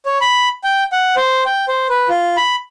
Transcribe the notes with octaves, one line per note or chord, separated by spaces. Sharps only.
C#5
B5
G5
F#5
C5
G5
C5
B4
F4
B5